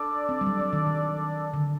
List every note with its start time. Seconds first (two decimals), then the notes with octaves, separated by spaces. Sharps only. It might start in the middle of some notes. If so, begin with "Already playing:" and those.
Already playing: D4 A4 D5
0.29 C4
0.41 G3
0.47 F#3
0.59 F#3
0.73 D#3
0.86 D#3
1.54 D3